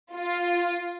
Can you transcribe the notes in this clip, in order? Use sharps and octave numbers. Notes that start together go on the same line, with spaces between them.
F4